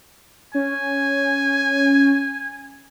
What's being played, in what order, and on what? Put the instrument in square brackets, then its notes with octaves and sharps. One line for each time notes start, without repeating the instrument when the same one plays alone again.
[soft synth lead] C#4 [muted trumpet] G#5